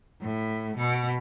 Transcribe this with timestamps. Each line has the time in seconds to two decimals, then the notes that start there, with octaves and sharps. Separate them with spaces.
0.21 A2
0.77 B2